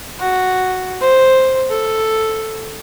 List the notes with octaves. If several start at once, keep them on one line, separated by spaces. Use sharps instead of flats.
F#4
C5
A4